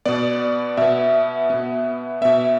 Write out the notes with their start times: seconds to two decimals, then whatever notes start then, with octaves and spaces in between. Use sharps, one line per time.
0.06 B2 B3 D5
0.77 B2 B3 E5
1.50 B2 B3
2.22 B2 B3 E5